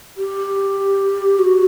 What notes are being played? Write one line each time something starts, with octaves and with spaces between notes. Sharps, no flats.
G4
F#4